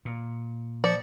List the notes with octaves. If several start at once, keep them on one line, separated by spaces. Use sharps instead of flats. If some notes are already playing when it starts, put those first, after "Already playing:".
A#2
F3 D5 A6 C#7